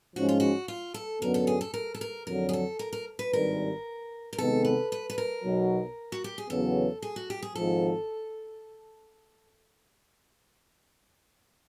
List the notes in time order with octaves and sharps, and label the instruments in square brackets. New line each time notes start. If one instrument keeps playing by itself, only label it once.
[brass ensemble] G#2 F3 G#3 C#4 [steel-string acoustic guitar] F#4
[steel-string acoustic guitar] F4
F#4
F4
A4
[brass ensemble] F#2 D3 F#3 B3 [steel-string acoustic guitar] A#4
[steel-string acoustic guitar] A4
G#4
A4
A#4
A4
A#4
[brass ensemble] F2 D3 F#3 [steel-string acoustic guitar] A#4
[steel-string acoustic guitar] G#4
A4
A#4
A#4
B4
[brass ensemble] G#1 G2 D#3 G3 [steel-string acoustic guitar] A#4
[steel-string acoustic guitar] A#4
[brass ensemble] C3 D#3 G#3 B3 [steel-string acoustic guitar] A4
[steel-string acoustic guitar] B4
B4
B4
A#4
[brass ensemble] B1 B2 F#3
[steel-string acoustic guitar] F#4
G4
G#4
[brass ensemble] E2 C#3 F#3 B3 [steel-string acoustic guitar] A4
[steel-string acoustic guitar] G#4
F#4
G4
G#4
[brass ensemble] G#1 G#2 F3 [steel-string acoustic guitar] A4